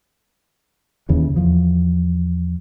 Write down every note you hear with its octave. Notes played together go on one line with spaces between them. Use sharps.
D#2 C#3 E3
E2 F3